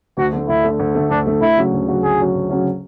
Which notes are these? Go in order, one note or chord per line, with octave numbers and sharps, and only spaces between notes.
D2 F#4
D3 A3
D2 E4
D3 A3
D2
D3 A3
D2 D4
D3 A3
D2 E4
C#3 F#3 C#4 F#4
D2
C#3 F#3 C#4 F#4
D2 G#4
C#3 F#3 C#4 F#4
D2
C#3 F#3 C#4 F#4